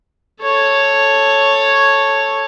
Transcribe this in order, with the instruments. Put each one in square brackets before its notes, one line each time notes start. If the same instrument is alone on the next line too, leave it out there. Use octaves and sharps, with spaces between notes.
[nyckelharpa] A4 C#5